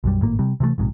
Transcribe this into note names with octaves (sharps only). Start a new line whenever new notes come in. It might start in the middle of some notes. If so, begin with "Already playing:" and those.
B1 F#2 G3
G#1 A2 A#3
C3 G3
C3 E3 F3 A3
A#1 G#2 C3